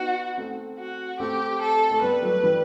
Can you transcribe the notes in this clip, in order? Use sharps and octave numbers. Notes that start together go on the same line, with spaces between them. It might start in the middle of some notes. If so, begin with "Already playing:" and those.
Already playing: B3 D#4 F#4
A3 C4
F#4
A3 C4 G4
A4
A3
G3 B3 B4
F#3 A3
E3 G3